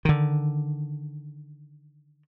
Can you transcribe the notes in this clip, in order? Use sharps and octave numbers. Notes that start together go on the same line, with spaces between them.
D3 D#3